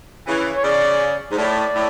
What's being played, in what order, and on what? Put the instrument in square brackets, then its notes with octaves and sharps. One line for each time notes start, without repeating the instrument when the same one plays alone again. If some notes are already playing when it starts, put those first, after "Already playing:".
[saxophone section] C#3 E3
[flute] C#5
[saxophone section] C#3 [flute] D5
[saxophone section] G#2
[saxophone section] A2 [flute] D5
[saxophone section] A2